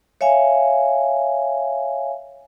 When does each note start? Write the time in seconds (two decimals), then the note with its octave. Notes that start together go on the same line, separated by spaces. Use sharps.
0.21 C#5 E5 F5 G#5